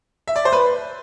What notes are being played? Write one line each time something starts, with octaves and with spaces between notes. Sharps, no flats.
E5
D5
C5
B4